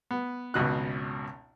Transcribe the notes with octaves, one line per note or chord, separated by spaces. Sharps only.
B3
G#1 C#2 B2 F#6